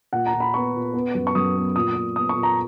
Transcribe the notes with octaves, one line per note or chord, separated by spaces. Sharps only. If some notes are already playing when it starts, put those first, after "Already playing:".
A#2 F#5
A#5
A#2
B5
B3 C#6
A#2
B3
F#2
C#6
F#2 D#6
B3
A#2 D#6
A#2
B3 D#6
C#6
A#2
A#5